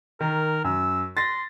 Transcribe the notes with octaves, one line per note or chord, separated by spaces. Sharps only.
D#3 A#4
F#2 E6
C6 A6 A#6